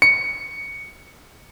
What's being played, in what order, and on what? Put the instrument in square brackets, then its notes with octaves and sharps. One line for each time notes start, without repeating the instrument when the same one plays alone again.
[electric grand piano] C#7